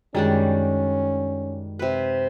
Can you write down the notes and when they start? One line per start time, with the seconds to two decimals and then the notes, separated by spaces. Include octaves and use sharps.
0.15 F#2 D#3 G3 G#3 C#4 D4 G#4
1.79 C3 B4